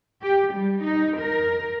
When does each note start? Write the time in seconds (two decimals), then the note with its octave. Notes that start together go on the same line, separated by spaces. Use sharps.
0.22 G4
0.53 G3
0.82 D#4
1.18 A#4